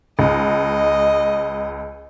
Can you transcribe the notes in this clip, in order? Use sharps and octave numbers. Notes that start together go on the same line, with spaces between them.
C#2 D#5